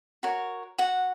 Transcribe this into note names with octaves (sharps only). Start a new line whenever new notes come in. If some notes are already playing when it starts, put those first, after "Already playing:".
F#4 A#4 C#5
F#4 F#5